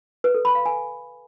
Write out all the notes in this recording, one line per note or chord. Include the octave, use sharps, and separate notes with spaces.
B4
A4
B5
F5
G#5